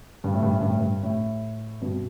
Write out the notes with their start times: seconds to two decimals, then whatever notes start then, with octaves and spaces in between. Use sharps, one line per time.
0.24 G2
0.34 A2
0.43 G2
0.52 A2
0.61 G2
0.70 A2
0.79 G2
1.03 A2
1.82 G2 B2